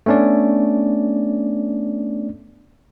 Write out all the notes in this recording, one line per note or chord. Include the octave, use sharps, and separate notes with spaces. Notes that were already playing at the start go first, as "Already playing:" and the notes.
A3 B3 C#4 D4 D5